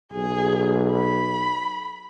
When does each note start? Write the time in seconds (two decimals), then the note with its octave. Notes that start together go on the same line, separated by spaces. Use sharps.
0.13 B1 G#4
0.94 B5